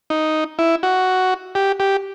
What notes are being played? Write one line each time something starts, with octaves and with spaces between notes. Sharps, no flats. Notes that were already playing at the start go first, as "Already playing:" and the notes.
D#4
E4
F#4
G4
G4